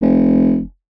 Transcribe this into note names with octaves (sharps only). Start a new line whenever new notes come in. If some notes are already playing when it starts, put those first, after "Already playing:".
F1